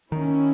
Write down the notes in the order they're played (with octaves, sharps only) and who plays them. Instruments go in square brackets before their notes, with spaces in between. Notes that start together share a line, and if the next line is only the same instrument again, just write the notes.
[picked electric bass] D#3 [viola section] A#3 C#4 E4